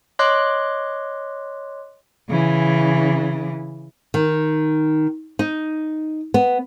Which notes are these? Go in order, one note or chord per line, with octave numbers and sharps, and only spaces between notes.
C#5 D#5 C6 D6 F#6
C#3 E3
D#3
D#4
B3